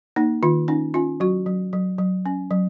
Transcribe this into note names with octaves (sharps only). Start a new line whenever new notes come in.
A#3 D#4
D#3 F4
C#4 D#4
C#4 F4
F#3 F#4
F#3
F#3
F#3
C#4
F#3